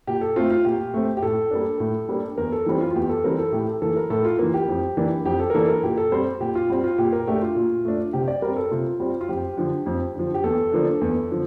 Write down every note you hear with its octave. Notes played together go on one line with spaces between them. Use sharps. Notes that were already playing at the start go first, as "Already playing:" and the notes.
A#2 G4
A4
A3 C4 F4
F4
A#2 G4
A3 C4
G4
A2 A4
G3 A#3 D4
A2
G3 A#3 D4
E2 A#4
A4
E3 G3 C4
F4
F4
E2 G4
A4
E3 G3 C4 A#4
A4
A2 G4
A4
E3 A#3 A4
A#4
A2 A4
F4
E3 A#3 F4
G4
F2
E3 A#3 D4
F2 G4
A4
A#4
E3 A#3 D4 A4
A#4
A#2 G4
A4
G3 C4 C5
A#2 G4
F4
G3 C4 G4
F4
A#2 G4
A#4
A3 D4 G4
F4
A#2
A3 D4
C3 G4
D5
G3 C4 A#4
A4
C3 F4
G3 C4
F4
F2 G4
D3 F3
F2
D3 F3
G4
E2 A4
D3 F3 A#3 D4
E2
D3 F3